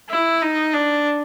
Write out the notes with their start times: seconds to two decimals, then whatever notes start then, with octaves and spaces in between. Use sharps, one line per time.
0.10 E4
0.42 D#4
0.74 D4